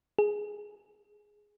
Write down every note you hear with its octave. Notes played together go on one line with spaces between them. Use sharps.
G#4